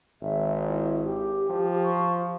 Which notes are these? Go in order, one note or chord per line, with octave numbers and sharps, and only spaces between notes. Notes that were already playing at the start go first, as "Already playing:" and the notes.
G#1 E5
E4
G4
F3
C#6